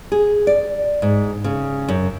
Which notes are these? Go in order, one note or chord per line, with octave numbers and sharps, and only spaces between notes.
G#4
D5
G#2
C#3
F#2